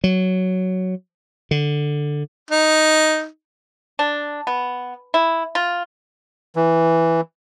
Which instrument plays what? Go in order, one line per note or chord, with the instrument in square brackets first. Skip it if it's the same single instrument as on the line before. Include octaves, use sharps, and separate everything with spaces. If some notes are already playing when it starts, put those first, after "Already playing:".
[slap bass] F#3
D3
[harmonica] D#4
[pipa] D4
B3
E4
F4
[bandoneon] E3